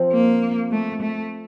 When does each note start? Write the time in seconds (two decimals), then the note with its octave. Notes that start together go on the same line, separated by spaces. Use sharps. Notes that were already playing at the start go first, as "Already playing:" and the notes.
Already playing: F3 C4
0.12 A#3
0.71 A3
1.01 A3